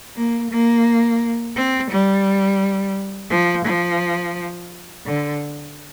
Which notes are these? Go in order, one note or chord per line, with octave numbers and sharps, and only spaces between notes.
A#3
A#3
C4
G3
F3
F3
D3